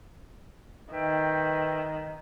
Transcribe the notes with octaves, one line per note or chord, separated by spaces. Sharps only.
D#3 B4 E5 G5